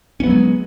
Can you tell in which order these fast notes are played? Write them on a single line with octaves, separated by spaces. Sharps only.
C#4 B3 F#3 G#3